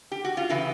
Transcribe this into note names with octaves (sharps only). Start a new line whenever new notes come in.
G4
F#4
F4
C#3 E3 E4